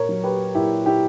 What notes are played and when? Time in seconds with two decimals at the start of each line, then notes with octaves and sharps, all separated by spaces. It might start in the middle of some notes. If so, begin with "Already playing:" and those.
Already playing: A#2 A#4 C#5
0.09 F#3
0.24 G4 B4
0.55 A#2 E4 G4
0.86 E4 G4